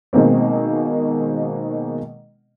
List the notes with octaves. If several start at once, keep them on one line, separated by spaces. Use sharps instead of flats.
B2 D#3 G#3 A#3 C4